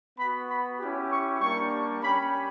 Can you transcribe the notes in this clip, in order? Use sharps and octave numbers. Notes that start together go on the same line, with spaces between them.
B3 F#4 B5
B5
C#4 E4 G4
C#6
G3 A#3 D4 C#6
C#4 G4 B5